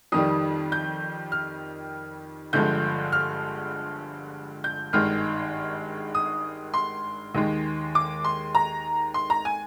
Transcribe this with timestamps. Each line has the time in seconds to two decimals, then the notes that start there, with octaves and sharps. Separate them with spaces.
0.12 F2 D#3 G3 D#6
0.72 G6
1.32 F6
2.53 G1 G2 D3 F3 G#3 G6
3.12 F6
4.64 G6
4.93 G#1 G2 D#3 G#3 F6
6.15 D#6
6.74 C6
7.35 D#2 D#3 G#3
7.95 D6
8.25 C6
8.55 A#5
9.14 C6
9.30 A#5
9.45 G#5